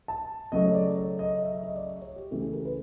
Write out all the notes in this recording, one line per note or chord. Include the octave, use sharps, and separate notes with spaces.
A5
C#3 F#3 A3 D#5
C#5
D5
C#5
D#5
E5
E5
D#5
D5
C#5
G4
C#3 E3 A3 G4
G#4
A#4
B4